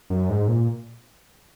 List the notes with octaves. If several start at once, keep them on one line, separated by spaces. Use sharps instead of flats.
F#2
G#2
A#2